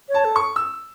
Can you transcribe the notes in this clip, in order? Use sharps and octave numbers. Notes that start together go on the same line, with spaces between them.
C#5
A5
A4
C#6
E6